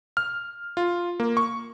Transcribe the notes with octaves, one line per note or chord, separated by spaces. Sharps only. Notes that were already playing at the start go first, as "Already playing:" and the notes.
F6
F4
A#3
C#6